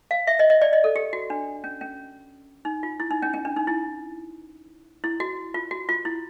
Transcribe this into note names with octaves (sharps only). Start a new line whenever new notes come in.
F5
E5
D#5
D#5
D5
D#5
A4
G4
F#4
D4
C#4
C#4
D#4
F4
E4
D#4
C#4
C#4
D4
D#4
E4
E4
F#4
F4
F#4
F4
E4